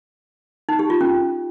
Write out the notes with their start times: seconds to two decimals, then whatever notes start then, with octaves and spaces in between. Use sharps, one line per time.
0.69 D#4
0.79 G4
0.90 F4
1.01 C#4